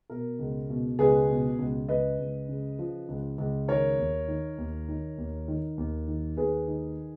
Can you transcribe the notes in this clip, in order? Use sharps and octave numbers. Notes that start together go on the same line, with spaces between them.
B2 A#4
C#2
B2
C#2 G#4 B4
B2
C#2
C#2 B4 D#5
C#2
C#3
F3
C#2
C#2
D#3 A#4 C#5
D#2
D#3
D#2
D#3
D#2
D#3
D#2
D#3
D#2 G#4 B4
D#3